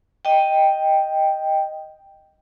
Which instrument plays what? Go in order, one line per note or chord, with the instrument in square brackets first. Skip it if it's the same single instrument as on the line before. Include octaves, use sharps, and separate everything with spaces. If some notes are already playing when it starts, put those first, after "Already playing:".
[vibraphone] D#5 G5